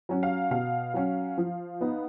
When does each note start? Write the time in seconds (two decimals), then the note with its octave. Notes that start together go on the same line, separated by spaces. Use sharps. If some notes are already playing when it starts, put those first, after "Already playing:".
0.09 F#3 C#4
0.23 F5
0.51 B2 F5
0.94 F#3 C#4
1.38 F3
1.81 B3 D#4